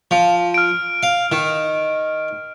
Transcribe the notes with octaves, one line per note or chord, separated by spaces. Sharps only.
F3
F6 D7
F5
D#3